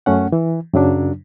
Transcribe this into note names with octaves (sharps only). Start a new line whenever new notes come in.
F#2 A3 C#4 F#5
E3
F#2 C#3 F#3 D4